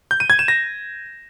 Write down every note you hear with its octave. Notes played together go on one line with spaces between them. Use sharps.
G6
D#7
G#6
E7
A#6